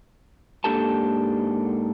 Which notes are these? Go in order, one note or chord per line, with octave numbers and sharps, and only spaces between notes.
G#2 A#3 D4 G4 A4 A5